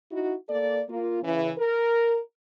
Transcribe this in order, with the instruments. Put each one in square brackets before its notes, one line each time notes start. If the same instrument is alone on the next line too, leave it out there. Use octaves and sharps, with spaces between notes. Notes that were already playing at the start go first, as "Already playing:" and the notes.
[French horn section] D#4 E4 F#4
A#3 A4 D5
A#3 F4
C#3 E3
A#4